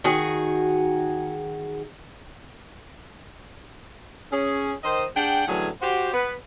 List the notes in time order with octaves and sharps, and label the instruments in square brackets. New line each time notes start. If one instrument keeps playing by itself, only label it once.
[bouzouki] D#3 F#4 G#4
[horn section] C#4 G#4
D#3 C5 D#5
D4 G#4 F#5 G5
A2 D3 E3 F#3 C#4 G#4
F#4 G4 C5
B3 B4